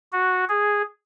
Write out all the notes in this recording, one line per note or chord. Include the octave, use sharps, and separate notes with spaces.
F#4
G#4